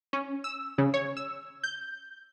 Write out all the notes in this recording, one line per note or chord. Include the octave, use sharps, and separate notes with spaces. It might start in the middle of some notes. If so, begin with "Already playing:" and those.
C#4
E6
C#3
C#5
E6
G6